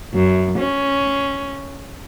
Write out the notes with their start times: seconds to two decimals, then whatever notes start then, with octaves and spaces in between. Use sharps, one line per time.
0.14 F#2
0.59 C#4